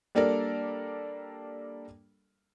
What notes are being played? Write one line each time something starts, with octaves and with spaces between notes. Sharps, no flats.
G3 A#3 D4 A4 A#4 D5